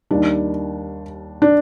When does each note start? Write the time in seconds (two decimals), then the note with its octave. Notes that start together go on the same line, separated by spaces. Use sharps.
0.11 D#2 D#3 G3 D4
1.42 D4